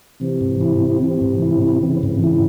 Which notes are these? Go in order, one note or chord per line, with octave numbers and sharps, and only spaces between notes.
C3 E3
G#2
E4
C4
C3 E3
G#2
E4
C4
C#3 E3
G#2
E4